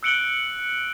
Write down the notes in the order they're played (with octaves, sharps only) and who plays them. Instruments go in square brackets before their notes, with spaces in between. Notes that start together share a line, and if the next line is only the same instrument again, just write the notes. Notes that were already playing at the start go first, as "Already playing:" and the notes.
[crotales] E6 F#6 C#7 D7 F#7 G7